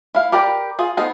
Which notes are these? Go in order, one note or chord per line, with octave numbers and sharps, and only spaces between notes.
E4 F5
G4 A#4 B4 D5 G5
F4 G#4
B3 D#4 A4 A#4 C5